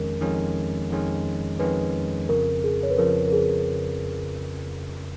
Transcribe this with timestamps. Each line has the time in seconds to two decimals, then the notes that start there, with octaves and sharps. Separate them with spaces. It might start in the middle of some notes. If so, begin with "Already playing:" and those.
Already playing: F2 D#3 G#3 C#4 A#4
0.21 F2 D#3 G#3 C#4
0.90 F2 D#3 G#3 C#4
1.59 F2 D#3 G#3 C#4 B4
2.29 F2 C#3 F3 A#4
2.64 G#4
2.83 C#5
2.90 B4
2.98 F2 C#3 F3 A#4
3.28 A#4
3.32 G#4